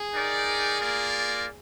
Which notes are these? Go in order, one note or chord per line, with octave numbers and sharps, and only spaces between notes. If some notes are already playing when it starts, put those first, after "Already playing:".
Already playing: G#4
D#4 A#4 D5 G5
A#3 F4 A#4 D5